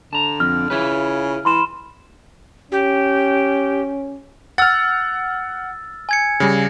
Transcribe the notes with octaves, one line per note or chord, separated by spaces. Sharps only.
D3 A5 A#5
F2 F6
C#3 E4 F4 B4
E3 B5 C6 E7
C#4 G4
F#5 E6 F6 A6
G#5 G#6 C#7
C#3 G3